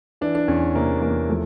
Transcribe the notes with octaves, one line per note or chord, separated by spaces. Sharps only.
E3 D4
D4
E2 C#4
C3 A#3
E2 A#3
F3 A3